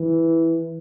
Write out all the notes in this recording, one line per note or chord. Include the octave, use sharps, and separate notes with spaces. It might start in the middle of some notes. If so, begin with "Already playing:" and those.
Already playing: E3